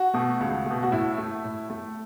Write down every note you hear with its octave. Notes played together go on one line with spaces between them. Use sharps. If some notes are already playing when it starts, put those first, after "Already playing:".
Already playing: F#4
B2 A3
C#2
B2 A3
F#4
A2 E4
A3
A2
A3